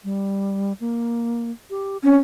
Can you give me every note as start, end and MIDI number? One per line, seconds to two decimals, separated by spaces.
0.04 0.73 55
0.80 1.51 58
1.70 1.98 67
2.03 2.15 60
2.03 2.16 61